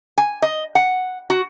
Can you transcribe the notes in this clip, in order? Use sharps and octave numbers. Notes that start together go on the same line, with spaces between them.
G#5
D#5
F#5
F#4